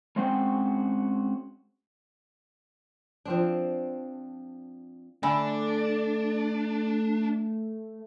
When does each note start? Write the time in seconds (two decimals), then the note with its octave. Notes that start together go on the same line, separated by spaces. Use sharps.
0.16 G#3 C4 C#4 F#4 C5 G5
3.25 F3 C4 D4
5.23 D3 A3 D4 G#5 B5 E6